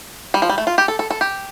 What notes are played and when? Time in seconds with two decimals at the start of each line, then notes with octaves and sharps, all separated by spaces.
0.34 G3
0.42 F3
0.49 G3
0.58 A3
0.67 F4
0.78 G4
0.88 A4
0.99 A4
1.10 A4
1.21 G4